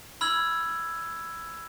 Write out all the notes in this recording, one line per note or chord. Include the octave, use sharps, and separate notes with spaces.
B5 E6 F6 G#6 F#7